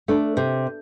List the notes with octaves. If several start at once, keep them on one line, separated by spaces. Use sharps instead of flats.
A3 D4
C3